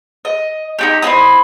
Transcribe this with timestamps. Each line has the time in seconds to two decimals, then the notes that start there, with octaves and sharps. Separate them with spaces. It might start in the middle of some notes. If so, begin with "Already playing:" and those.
0.25 D#5
0.79 D#4 F#4 G4
1.02 C4 D#4 E4 D#6